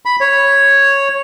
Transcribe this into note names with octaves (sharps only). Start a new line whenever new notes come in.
B5
C#5